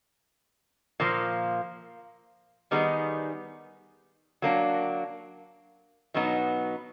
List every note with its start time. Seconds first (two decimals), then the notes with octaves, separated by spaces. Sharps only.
1.00 A#2 F3 A#3
2.71 D#3 G3 B3 D#4 G#4
4.42 F#3 A#3 D4
6.14 B2 F#3 B3 D#4